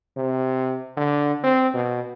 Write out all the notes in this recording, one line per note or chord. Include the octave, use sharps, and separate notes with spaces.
C3
D3
C4
B2